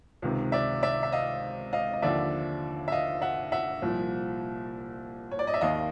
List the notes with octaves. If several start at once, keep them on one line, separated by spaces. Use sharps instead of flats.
C#2 C3 D#3
D5 E5
D5 E5
E5
D#5 F5
D#5 F5
D#5
D#2 D3 F3 D5 E5
E5
D#5 F5
E5 F#5
E5 F#5
C2 A#2 F3
C#5
D5
D#5
E5
D#2 D#3 D#5 F5